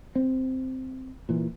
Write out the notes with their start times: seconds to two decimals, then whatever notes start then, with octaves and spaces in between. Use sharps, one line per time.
0.15 C4
1.29 A#2 E3